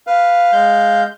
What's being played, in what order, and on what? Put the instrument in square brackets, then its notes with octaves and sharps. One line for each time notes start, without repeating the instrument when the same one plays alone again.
[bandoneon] B4 [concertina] F5
[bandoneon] G#3 G6